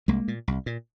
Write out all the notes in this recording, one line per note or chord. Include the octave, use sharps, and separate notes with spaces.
C2 G#3 A#3
A#2
C2
A#2